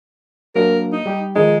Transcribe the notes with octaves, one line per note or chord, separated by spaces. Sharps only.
F#3 A#3 D4 A#4
D#4
G3 G4
D#3 F3 G#3 D#4